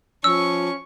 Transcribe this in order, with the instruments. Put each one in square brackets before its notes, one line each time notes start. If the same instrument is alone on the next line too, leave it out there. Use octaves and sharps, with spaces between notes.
[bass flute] F3 [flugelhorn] C#4 [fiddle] C#6 [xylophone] E6